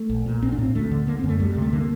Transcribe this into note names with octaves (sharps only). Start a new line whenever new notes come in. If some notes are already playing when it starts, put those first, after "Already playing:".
Already playing: A3
A#1
A#2
A#1 C4
D4
A2 C4
D2 A3
D3
D3 A#3
C4
F#2
A3
D2 G3
G3
C3
A3
D3 A#3